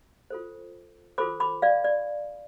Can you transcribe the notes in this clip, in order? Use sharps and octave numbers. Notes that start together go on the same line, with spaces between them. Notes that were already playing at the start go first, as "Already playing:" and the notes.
F4 A4 C5
F4 A4 C5 B5 D6
B5 D6
D5 F5
D5